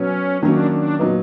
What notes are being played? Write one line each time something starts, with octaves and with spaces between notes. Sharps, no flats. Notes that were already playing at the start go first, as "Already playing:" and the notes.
Already playing: B2 F#3 B3 C#4
D#3 F#3 A#3 C#4 D4
D4
A#2 F#3 B3 D#4